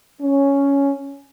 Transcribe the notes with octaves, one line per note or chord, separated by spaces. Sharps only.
C#4